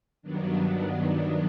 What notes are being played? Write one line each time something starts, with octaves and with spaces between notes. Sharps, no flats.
G2 D#3 F#3 B3 D4